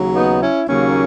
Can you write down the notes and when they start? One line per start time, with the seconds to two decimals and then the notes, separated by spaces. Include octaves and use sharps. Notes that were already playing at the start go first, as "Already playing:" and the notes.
Already playing: D#2 C#3 F#3
0.14 B3 D#4
0.41 C#4 E4
0.67 D#2 C#3 F#3 A#3 C#4